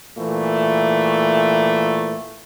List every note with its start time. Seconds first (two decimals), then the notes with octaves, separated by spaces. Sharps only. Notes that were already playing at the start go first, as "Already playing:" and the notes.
0.18 A#2 E3 A3